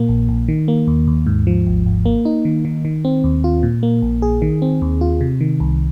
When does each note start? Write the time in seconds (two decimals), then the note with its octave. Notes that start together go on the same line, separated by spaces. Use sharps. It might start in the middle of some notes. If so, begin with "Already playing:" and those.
Already playing: A#2 A#3
0.09 A#1
0.29 A#1
0.48 D#3
0.68 A#3
0.87 D#2
1.07 D#2
1.26 G#2
1.47 F3
1.67 G#1
1.86 G#1
2.06 A#3
2.25 D#4
2.45 D#3
2.65 D#3
2.85 D#3
3.05 C4
3.24 D#2
3.44 F4
3.63 A#2
3.83 A#3
4.02 A#1
4.22 G#4
4.42 D#3
4.62 C4
4.82 D#2
5.01 F4
5.21 C3
5.41 D#3
5.60 C2